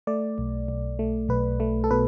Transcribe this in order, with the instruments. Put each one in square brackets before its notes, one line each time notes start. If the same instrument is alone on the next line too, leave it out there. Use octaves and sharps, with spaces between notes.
[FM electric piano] A3 D5
B1
B1
A3
B1 B4
A3
A4
B2 B4